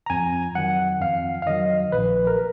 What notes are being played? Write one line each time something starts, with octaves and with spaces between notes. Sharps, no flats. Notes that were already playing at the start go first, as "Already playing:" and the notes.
A#5
F2 G#5
D#3 F#3 F#5
F2 F5
F5
D#3 F#3 D#5
A#1 B4
A#4